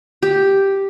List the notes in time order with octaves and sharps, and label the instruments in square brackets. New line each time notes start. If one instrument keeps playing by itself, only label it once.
[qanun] G4